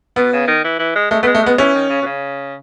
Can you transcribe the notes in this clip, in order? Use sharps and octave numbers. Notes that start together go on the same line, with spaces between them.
B2 B3
C#3
D#3
E3
E3
G#3
G#3 A3
A3 B3
G#3
A3
G#3 B3
E3 C#4
D#3
C#3
B2
C#3